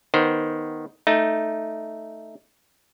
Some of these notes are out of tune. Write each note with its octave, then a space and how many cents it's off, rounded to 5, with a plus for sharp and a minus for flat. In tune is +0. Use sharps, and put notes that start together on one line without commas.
D#3 +0 B3 -10 C5 +0
A3 +0 D#4 +0